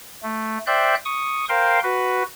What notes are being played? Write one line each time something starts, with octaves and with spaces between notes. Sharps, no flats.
A3
C5 D5 E5 G5 F#6 G6
C#6 D#6
A#4 C5 F5 G5 C6
F#4 B4